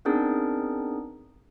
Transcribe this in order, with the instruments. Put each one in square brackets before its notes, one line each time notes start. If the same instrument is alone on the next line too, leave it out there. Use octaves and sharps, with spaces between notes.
[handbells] B3 C4 D4 D#4 G#4 A#4